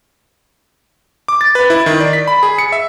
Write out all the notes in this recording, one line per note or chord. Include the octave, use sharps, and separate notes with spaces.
D6
A6
B4
E4
D#3
D5
B6
B5
G#4
C#7
E5